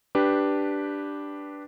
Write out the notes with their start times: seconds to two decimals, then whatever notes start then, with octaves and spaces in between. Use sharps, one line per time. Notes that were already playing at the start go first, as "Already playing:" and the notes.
0.15 D4 G4 B4